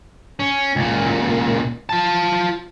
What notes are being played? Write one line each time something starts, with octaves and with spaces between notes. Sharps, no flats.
C#4
C#2 A#2
F4 A5